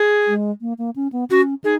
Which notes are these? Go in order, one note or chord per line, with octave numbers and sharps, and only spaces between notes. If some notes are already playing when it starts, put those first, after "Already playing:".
Already playing: G#4
G#3
A#3
A#3
C#4
B3
C#4 F#4
D#4 G#4